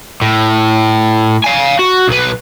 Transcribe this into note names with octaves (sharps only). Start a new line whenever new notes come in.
A2
F5 G#5
F#4
B1 B4